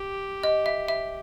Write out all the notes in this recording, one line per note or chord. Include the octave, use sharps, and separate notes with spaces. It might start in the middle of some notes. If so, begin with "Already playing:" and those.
Already playing: G4
D#5
E5
E5